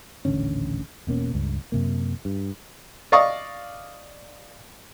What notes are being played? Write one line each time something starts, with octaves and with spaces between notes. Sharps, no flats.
D#1 A1 D3 C#4
E1 B2 A#3 C#4
C#2 G2
F#2 C3 A#3
G2
D5 D#5 F5 C#6 D#6